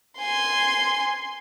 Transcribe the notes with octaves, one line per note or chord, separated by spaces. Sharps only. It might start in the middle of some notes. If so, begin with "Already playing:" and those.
G#5 C6